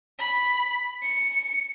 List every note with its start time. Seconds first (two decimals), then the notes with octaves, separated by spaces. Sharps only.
0.19 B5
1.02 C#7